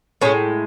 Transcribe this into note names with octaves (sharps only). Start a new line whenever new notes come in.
A2 G#3 C#4